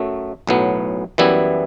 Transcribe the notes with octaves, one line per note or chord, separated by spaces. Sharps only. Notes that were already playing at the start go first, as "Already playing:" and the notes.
Already playing: F#2 F#3 A3
B1 A2 F#3 B3
F#2 E3 G3 B3 E4